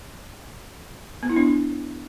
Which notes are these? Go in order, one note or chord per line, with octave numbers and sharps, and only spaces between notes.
B3
E4
D4